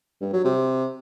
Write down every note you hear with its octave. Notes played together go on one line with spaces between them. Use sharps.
G2
F#3
C3